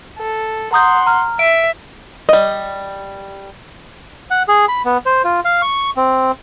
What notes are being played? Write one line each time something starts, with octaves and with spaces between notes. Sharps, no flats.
A4
F#5 A#5 C6 D#6 G6
A#5 F6
E5 D7
G3 D#5
F#5
G#4
B5
B3
C5
F4
F5
C#6
C4